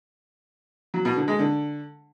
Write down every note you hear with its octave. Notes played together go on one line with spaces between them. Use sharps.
F#3
B2
D3
G#3
D3